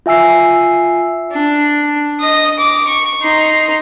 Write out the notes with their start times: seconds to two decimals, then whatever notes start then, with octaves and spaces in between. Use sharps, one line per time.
0.06 F4 E5 G#5 E6 C7
1.32 D4
2.20 D#5 D#6
2.58 D6
2.87 C#6
3.22 D#4 C6